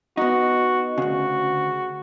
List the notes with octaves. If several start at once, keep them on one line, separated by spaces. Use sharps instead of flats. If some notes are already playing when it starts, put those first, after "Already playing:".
B3 D#4 F#4
D2 C#3 F#4